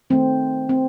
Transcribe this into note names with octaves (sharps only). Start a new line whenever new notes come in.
D#3 A3 C4
C4